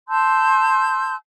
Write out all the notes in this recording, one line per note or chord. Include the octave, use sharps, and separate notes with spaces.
A5 C6 E6 G6